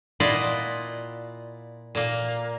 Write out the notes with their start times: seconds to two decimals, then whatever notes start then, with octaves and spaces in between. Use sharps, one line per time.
0.20 A#2 E4 F4 D5 D#5 F#5
1.95 A#2 A#3